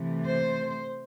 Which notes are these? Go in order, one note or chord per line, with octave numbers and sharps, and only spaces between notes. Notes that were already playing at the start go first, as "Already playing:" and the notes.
Already playing: C3 E3 A3
C5